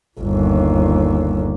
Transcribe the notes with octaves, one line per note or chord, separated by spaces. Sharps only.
G1 D#2